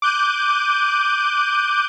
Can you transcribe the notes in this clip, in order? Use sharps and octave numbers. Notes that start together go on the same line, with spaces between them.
D6 F#6 G6 D#7